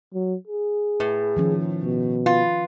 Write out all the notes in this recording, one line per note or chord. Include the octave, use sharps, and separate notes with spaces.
F#3
G#4
A2 B4
D#3 F3 C#4
B2
F4 B4